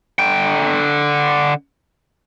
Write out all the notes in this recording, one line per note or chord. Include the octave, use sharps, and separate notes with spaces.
D3 G5